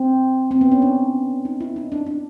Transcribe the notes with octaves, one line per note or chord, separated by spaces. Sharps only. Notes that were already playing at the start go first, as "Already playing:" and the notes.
Already playing: C4
C4
B3
C#4
D4
D#4
E4
D#4
D4
D4